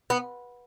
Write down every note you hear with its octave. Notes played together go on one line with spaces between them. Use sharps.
B3